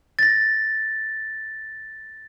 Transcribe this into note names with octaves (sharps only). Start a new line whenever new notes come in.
A6 A#6